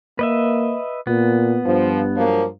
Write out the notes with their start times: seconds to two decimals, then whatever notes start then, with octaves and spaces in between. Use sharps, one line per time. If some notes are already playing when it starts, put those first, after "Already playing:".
0.19 A#3 B4 D#5 E5
1.07 A#2 B3
1.66 G2 F3
2.16 F3 F#3 A#3